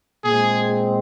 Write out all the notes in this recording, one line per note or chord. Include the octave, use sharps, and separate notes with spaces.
A#2 G#3 C4 G#4